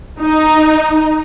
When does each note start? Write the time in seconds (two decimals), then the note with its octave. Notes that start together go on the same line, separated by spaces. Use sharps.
0.20 D#4